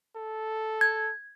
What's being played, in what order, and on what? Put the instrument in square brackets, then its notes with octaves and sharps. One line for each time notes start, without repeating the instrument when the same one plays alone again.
[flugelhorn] A4
[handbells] G#6